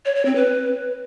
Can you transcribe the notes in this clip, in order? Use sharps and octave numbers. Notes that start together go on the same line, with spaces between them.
C#5
C#5
C4
B4